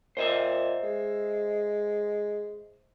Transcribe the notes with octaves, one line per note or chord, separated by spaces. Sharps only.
A#2 C5 D#5 E5
G#3